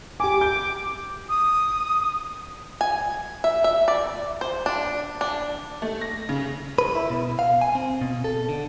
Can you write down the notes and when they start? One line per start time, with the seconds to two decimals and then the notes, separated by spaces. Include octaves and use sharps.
0.20 G4 G#5 D6
0.41 G6
1.29 D#6
2.81 G#5
3.44 E5
3.64 E5
3.88 D5
4.41 C5
4.66 D4
5.21 D4
5.82 A3
6.01 A#6
6.29 C#3
6.78 B4
6.95 E4
7.10 B2
7.39 F5
7.61 G#5
7.75 C4
8.01 B2
8.24 A4
8.49 D3